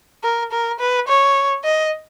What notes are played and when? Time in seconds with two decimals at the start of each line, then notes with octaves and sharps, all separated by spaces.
0.23 A#4
0.52 A#4
0.80 B4
1.08 C#5
1.64 D#5